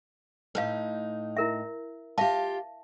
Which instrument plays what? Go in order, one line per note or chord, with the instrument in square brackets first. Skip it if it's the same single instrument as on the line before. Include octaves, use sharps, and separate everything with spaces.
[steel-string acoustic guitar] A2 D#4 [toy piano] B4 F5
[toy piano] E4 A#4 E5
[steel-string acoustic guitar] F4 G4 [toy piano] E5 F5 A5